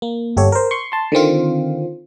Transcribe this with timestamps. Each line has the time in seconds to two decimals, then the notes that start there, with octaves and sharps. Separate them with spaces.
0.02 A#3
0.37 G1 G4 A4 C#5
0.52 A#4 C5
0.71 C6 C#6
0.92 A5 C6
1.12 D3 D#3 C4 F4